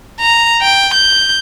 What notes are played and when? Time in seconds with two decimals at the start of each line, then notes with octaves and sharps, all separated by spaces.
0.21 A#5
0.62 G5
0.95 G6